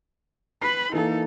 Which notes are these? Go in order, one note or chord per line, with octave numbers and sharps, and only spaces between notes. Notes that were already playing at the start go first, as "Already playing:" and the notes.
B4 B5 C7
E3 A#3 D#4 A4